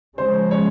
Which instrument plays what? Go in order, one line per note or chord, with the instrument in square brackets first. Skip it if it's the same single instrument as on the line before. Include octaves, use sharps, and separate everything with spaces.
[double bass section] C#3 F3 G#3 C#4 [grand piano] C5
[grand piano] C#5